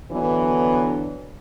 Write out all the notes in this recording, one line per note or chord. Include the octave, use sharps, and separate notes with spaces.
D3 E3 F#3 B3 D4